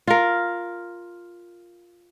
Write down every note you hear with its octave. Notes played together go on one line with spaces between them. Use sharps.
F4 A#4